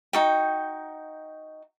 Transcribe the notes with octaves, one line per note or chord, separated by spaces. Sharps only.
D#4 F#4 G5